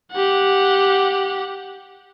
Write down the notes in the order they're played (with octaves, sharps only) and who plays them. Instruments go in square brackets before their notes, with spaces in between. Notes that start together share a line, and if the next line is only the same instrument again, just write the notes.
[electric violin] G4 F#5